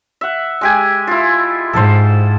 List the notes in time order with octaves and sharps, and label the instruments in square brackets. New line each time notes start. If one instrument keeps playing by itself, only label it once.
[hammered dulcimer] E5 F#5
G#3 G4 G#5
E4 F4
[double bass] G#2 [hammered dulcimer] A4 C5